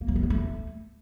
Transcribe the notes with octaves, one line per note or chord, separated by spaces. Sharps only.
A#3
F#3
A3
B3
A3